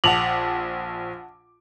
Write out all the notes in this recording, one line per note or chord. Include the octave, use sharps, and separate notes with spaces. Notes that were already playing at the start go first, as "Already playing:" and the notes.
A#1 F#5 A5 D6 F7 F#7